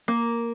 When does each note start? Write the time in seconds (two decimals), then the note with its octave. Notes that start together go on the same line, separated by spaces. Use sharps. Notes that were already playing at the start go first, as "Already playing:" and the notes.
0.08 A#3